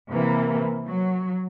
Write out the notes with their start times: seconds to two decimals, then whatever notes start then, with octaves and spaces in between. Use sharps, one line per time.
0.11 C3 E3 A#3
0.87 F#3